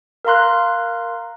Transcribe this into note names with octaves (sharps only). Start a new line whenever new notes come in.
A#4 F5 A#5 C6 F#6